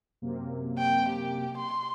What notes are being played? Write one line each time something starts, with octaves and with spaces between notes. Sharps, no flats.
F#2 C3 A#3
G5
G4
C6